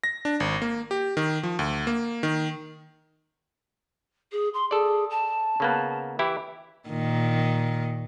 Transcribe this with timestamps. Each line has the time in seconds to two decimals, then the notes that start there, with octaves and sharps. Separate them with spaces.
0.04 A#6
0.25 D4
0.40 G#1
0.62 A#3
0.91 G4
1.17 D#3
1.43 F3
1.59 D2
1.87 A#3
2.23 D#3
4.32 G#4
4.54 C6
4.71 G#4 A4 D5
5.10 A5
5.60 C#3 A#3 B3
6.19 E3 E4 G4
6.89 A#2 D#3